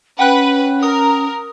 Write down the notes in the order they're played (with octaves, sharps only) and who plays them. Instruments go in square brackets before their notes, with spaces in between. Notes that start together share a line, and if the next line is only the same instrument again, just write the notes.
[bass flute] C#4 [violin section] B4 [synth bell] F#5 G5 F#6
[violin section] A#4 [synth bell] D#6